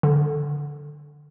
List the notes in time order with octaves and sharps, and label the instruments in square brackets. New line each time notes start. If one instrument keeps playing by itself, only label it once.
[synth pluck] D3